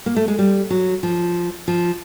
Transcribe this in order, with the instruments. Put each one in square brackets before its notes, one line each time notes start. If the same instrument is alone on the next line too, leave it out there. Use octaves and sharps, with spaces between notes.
[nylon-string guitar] A#3
A3
G#3
G3
F#3
F3
F3